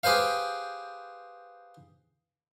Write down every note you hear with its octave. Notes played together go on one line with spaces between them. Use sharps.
G4 G#4 B4 C5 F5